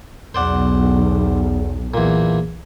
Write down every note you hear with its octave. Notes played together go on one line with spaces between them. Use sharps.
B1 E2 C5 D5 F#5
E2 A#2